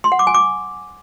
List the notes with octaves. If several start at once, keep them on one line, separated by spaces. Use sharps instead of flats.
C6
F#5
D6
G#5
D6